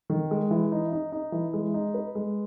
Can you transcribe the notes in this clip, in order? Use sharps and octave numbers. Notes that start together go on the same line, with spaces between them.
D#3
G#3
E3
D#4
D#4
D#4
E3
G#3
D#4
B4
G#3